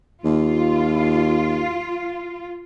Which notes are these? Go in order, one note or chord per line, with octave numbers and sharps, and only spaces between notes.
D#2 F4